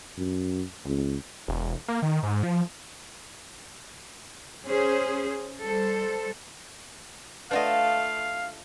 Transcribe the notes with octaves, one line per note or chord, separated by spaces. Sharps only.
F#2
C#2
E1
A#3
D#3
G#2
F3
C#4 G#4 C5
G3 A4 C5
A3 D4 F4 B4 D5 D#5 F5 F#5